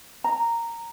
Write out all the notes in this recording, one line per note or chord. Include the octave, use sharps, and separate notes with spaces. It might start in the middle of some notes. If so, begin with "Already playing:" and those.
A#5